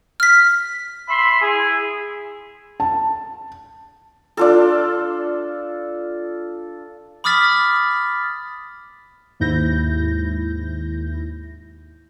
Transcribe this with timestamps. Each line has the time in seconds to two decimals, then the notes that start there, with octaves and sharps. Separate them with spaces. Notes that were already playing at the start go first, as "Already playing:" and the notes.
0.20 F6 B6
1.09 E5 B5 C6
1.42 E4 G#4
2.80 A5
4.37 D4 F4 A4
7.24 B5 D6 D#6 F6 A6 B6
9.40 D#2 G#2 E4 G6 A#6